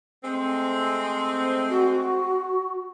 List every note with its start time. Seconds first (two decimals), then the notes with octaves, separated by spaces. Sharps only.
0.24 G#3 A3 C4
1.70 F#4